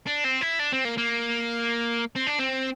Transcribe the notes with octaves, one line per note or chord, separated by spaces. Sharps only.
D4
C4
E4
D4
C4
A#3
A#3
C4
D4
C4